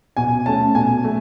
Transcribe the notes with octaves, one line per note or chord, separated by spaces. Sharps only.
B2 G#5
A3 C#4 A5
B2 G#5
A3